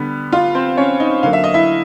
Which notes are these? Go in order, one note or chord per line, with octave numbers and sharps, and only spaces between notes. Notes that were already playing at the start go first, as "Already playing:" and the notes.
Already playing: D3 G3 B3
F4 F5
C4 C5
C#4 C#5
D#4 D#5
D3 F#3 A#3 F5
E5
D#5
E4 E5